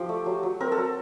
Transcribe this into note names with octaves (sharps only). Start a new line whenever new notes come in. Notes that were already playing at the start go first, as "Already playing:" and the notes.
Already playing: F3 G4
A3
F#3
F#3
C4 A#4
A4
F#3